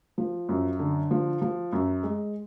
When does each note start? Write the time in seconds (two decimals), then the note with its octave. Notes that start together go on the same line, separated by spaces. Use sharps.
0.18 F3
0.49 F#2
0.79 D3
1.11 F3
1.41 F3
1.73 F#2
2.03 G#3